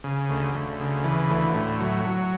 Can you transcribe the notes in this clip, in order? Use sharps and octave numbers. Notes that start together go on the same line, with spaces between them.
C#3
D2
D2
C#3
E3
D2
A2
F#3
F#3